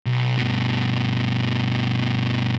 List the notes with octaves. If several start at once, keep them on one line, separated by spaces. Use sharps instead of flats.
B1
G2 B2